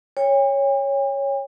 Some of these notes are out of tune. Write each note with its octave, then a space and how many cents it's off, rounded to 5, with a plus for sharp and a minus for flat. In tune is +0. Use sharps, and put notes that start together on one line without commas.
C#5 +0 G5 +45